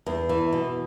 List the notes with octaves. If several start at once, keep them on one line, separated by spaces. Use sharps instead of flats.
E2
E3
B2